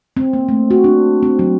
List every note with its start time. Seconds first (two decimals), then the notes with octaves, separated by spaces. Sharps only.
0.17 C4
0.33 A#3
0.49 A3
0.71 F#4
0.84 D4
1.23 C4
1.39 F#3